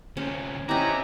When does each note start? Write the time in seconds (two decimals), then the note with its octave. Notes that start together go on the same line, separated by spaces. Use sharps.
0.17 D2 C3 C#4
0.69 C4 C#4 D#4 E4 F#4 G4 B4 A#5